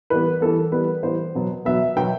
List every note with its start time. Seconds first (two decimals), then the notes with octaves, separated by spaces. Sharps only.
0.10 E3 G3 B3 B4
0.41 E3 G3 B3 A4
0.72 E3 G3 B3 B4
1.03 E3 G3 B3 C5
1.35 B2 F#3 B3
1.65 B2 F#3 B3 E5
1.96 B2 F#3 B3 G5